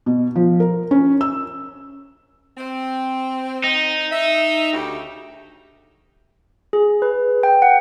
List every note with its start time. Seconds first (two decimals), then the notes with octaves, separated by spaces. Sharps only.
0.06 B2
0.36 F3
0.60 A#4
0.91 C#4
1.21 E6
2.58 C4
3.64 D#4
4.12 E5
4.73 D2 C#3 G4
6.73 G#4
7.02 B4
7.43 G5
7.62 F#5